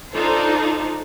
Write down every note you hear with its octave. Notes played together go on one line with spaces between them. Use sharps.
D4 D#4 F4 A4 C5